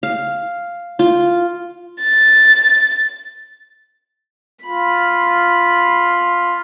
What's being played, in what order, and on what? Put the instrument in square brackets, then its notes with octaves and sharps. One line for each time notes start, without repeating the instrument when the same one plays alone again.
[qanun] F5
F4
[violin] A6
[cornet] F4 [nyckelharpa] B5